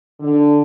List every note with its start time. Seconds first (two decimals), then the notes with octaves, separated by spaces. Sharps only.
0.20 D3